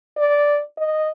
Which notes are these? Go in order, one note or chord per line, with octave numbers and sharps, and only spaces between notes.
D5
D#5